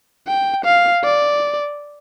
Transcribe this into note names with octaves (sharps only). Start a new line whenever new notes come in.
G5
F5
D5